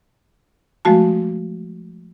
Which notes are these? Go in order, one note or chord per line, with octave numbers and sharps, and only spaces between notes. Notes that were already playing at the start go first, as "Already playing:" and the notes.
F3 G#3 A3 F#4 A5